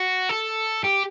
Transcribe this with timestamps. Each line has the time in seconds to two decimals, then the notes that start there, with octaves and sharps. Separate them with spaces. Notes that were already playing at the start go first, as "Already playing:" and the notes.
Already playing: F#4
0.29 A4
0.84 G4